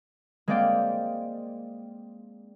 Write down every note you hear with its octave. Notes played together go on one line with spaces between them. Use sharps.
G#3 A#3 C4 D5 F5 G5